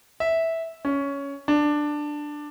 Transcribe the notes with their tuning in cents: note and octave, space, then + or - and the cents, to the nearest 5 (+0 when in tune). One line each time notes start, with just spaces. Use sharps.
E5 -10
C#4 +10
D4 +10